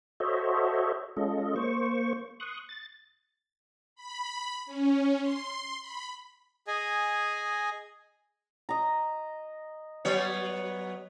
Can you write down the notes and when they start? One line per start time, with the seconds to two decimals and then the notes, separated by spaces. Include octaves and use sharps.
0.20 F#4 A4 C5 C#5 D#5 E5
1.17 G#3 C#4 F4 A4 D#5
1.56 A#3 C5 C#6
2.40 C6 C#6 D#6 F#6
2.69 A6
3.95 B5
4.66 C#4
5.19 C6
5.80 B5
6.67 G#4 D#5 G#5
8.69 D#5 A#5
10.05 F#3 B3 C#5